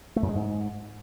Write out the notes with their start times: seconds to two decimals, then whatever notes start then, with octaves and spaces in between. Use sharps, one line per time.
0.16 A3
0.23 F#2
0.29 G#3
0.35 G#2